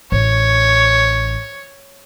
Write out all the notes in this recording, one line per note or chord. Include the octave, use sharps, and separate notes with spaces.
A1 C#5